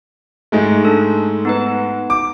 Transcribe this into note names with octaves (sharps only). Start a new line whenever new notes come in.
G#2 G#3 A3
D4 A4
B3 D#4 B4
D6